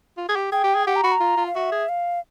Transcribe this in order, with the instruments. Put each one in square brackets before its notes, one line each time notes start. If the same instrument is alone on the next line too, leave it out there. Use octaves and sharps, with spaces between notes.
[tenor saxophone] F4
G#4
G4
[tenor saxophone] G#4 [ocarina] G5
[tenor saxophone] G4
G#4
[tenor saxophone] G4 [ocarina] F#5
[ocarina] A#5
[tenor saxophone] F#4 [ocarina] B5
[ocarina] A#5
[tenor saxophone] F4
F4
[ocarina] F5
[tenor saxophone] F#4 [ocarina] E5
[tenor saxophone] G#4
[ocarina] F5